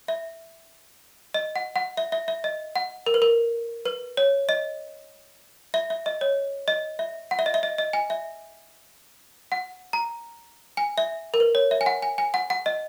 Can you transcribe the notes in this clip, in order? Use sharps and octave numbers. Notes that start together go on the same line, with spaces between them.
E5
D#5
F#5
F#5
E5
E5
E5
D#5
F#5
A#4
B4
A#4
B4
C#5
D#5
E5
E5
D#5
C#5
D#5
E5
F#5
E5
D#5
E5
D#5
D#5
G#5
E5
F#5
A#5
G#5
E5
A#4
B4
C#5
E5
G#5
F#5
G#5
G#5
F#5
F#5
D#5